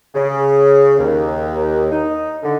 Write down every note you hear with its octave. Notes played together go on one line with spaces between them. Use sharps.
C#3
D#2
D#4
D3